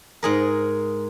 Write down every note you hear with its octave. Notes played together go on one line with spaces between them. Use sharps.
G#2 G#4 A#4